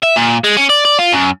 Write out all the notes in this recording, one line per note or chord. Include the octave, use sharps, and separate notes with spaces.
E5
A#2
G#3
C#4
D5
D5
F4
F#2